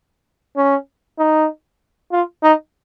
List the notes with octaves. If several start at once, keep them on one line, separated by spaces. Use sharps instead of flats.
C#4
D#4
F4
D#4